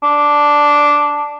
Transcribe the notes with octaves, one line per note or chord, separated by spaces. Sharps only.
D4